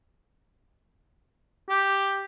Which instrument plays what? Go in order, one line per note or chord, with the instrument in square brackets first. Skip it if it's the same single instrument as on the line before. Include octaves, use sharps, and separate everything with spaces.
[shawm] G4